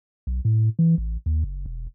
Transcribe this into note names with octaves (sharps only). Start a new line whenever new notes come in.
B1
A2
E3
A1
D#2
F#1
E1